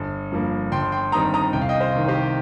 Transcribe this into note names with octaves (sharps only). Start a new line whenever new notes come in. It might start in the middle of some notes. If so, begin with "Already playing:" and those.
Already playing: G1
G2 F3 A#3
G1 G5 C6
G5 C6
G2 D#3 G3 C4 A#5 D#6
A#5 D#6
C2 G5
F5
D#5 G5
C5 F5
C3 D#3
G4 C5